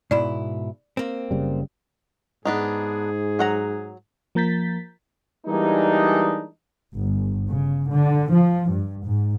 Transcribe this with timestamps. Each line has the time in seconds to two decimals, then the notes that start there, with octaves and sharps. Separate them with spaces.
0.11 G#2 B2 E4 D5
0.97 A#3 C4
1.31 F#1 C#3 G3
2.45 G#2 B3 D4 D#4 G#4
3.39 F#3 F#5 A#5
4.35 F3 A#3 A#5 G6 A6 B6
5.47 E3 G3 G#3 A#3 D4 D#4
6.96 G1
7.49 C#3
7.89 D3
8.31 F3
8.70 G2
9.04 G#2